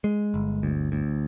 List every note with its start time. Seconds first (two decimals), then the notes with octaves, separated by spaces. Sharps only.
0.04 G#3
0.34 G1
0.63 D2
0.92 D2